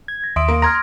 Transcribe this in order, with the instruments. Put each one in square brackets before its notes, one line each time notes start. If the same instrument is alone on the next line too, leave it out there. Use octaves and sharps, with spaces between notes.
[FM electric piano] G#6
[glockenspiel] A#6
[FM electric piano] D#2 [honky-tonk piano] E5 [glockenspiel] C6 D#6 D7
[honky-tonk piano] A#3
[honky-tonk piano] A#5 C6 [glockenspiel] F6 G#6 A#6